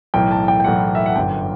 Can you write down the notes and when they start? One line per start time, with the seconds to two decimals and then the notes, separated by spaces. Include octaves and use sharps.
0.14 B1 A2 E3 G5
0.31 A5
0.48 G5
0.60 G5
0.64 B1 A2 E3 F#5
0.95 E5
1.06 F#5
1.16 G1 F#2 D3 G5